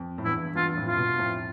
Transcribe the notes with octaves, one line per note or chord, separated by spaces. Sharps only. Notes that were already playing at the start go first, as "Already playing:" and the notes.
Already playing: F2
A2
E2 G2 E4
E2 G2 F4
F2 A2
F4
G2 B2
F2 A2